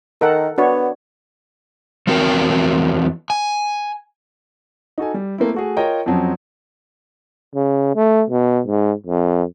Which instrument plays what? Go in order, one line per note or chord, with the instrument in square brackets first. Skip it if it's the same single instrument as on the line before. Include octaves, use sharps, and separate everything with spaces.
[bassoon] D#3 [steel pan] A4 A#4 F#5
[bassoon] B3 [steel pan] D4 F#4 C#5
[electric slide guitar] E2 F3 C4 F#4 A#4 G5
G#5
[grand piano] D#4 F#4 A4 G#5
G3
A3 A#3 C4 E4
A3 F#4 G#4
F4 A#4 C#5 D#5 G5 A#5
F2 F3 F#3 C4 C#4
[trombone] C#3
A3
B2
G#2
F2